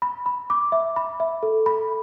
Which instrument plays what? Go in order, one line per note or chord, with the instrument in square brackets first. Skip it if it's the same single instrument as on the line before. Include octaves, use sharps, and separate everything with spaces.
[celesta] B5
B5
D6
E5
B5
E5
A4
B5